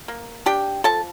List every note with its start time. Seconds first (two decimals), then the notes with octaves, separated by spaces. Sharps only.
0.08 A#3
0.46 D4 G4 G5
0.84 F3 A4 A5